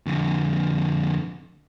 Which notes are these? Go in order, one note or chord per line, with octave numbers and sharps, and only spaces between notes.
F2 D3